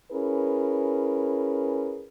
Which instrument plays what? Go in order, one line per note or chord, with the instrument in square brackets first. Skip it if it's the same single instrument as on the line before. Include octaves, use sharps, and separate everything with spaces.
[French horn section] C#4 E4 G#4 A#4 B4